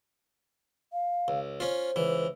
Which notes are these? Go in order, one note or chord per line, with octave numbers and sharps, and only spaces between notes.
F5
C#2
C#4 F4 C5
C#2 E3